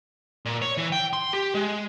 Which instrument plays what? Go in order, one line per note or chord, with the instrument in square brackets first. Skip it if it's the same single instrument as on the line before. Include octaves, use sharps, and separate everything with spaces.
[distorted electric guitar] A#2
C#5
E3
G5
C6
G4
G#3